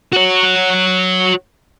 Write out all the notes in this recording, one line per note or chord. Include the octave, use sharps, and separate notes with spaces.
F#4 C#5